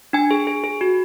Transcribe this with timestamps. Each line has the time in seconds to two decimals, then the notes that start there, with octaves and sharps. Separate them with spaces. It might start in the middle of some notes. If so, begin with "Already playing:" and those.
0.13 D4 G#5
0.31 G#4
0.47 G#4
0.64 G#4
0.81 F#4